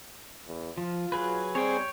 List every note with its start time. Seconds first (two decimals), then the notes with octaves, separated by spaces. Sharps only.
0.46 E2
0.78 F3 F4
1.12 F#3 G#4 B4
1.55 G3 C4 G#4 C#5 G5